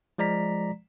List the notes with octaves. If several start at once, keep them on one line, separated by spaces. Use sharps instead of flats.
F3 G#3 D5 A#5 B6